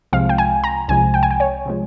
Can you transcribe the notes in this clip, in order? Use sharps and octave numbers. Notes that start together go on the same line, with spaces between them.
C2 C3 F3 G#3 F5
G5
G#5
A#5
C2 C3 F3 G#3 G#5
G5
G#5
G5
C#5
C3 F3 G#3